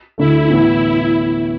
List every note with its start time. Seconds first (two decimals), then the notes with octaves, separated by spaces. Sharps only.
0.18 D2 D3 A3 E4
0.50 A2 E3 B3